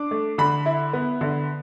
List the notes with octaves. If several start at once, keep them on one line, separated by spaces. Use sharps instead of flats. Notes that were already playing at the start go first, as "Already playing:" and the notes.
Already playing: D4 D6
A3
D3 B5
E4
B3
D3